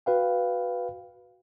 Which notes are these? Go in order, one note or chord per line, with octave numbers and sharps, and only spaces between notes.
F#4 B4 F5 G5